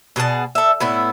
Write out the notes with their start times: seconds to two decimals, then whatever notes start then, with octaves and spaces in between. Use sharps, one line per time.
0.16 B2 G#4 F#5 A5
0.55 A4 E5
0.80 A2 B3 E4